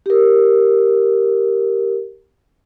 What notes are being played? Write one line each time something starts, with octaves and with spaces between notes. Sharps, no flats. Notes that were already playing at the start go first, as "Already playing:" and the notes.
G4 A#4